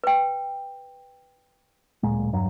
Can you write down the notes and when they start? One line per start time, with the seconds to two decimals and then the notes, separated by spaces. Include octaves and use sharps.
0.04 B4 G5
2.03 D1 A#2 G#3
2.32 E1 G2 F#3